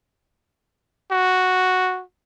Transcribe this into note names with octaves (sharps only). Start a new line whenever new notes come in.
F#4